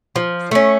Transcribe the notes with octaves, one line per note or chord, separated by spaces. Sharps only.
F3
A3 C#4